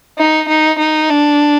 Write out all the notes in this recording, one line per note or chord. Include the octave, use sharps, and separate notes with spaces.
D#4
D#4
D#4
D4